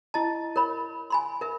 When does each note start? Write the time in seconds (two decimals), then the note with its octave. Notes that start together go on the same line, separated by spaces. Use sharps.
0.14 E4 D#5 A5
0.56 A#4 C#5 B5
1.10 G#5 B5 C6
1.41 A#4 E5